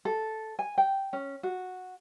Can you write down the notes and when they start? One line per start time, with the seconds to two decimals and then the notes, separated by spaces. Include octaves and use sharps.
0.05 A4
0.59 G#5
0.78 G5
1.13 C#4
1.43 F#4